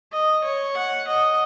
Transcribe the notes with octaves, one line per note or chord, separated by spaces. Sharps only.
D#5
C#5
F#5
D#5